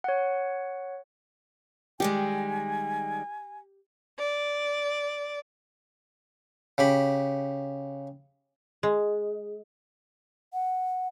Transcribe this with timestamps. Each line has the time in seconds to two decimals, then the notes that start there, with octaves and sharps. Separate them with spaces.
0.04 C#5 F#5
2.00 D#3 G3 G#3 G4 G#5
4.18 D5
6.78 C#3 G4 B5
8.83 G#3
10.53 F#5